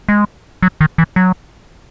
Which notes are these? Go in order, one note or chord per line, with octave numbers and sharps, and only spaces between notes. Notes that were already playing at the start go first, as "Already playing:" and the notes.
G#3
F#3
D#3
E3
F#3